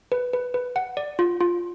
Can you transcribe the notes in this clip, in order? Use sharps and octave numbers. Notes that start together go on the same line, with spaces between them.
B4
B4
B4
F#5
D5
F4
F4